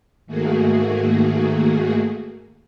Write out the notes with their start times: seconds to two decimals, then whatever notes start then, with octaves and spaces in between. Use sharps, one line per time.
0.26 G#2 D#3 A3 A#3 F#4 G#4